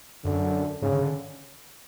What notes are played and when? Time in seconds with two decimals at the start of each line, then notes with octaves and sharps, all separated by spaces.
0.25 F#2 D3
0.82 G#2 C#3
0.92 D3
1.02 D3